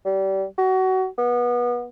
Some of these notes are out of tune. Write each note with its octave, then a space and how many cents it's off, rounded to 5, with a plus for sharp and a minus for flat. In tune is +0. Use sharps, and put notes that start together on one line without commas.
G3 -30
F#4 +25
B3 -25